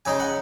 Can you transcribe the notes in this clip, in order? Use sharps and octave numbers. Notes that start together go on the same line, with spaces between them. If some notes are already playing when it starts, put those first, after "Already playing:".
C#3 G#3 D#4 G#5
F#5